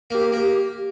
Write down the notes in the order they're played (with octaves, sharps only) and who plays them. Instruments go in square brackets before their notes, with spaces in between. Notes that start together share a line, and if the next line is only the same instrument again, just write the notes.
[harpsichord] A#3 [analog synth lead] G4
[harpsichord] A#3 [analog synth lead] G4